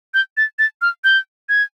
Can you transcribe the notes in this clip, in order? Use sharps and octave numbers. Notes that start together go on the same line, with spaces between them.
G6
A6
A6
F6
G6
G#6